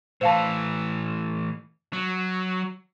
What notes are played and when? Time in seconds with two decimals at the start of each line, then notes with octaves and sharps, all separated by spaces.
0.21 A2 E3 C5 F5 A5
1.93 F#3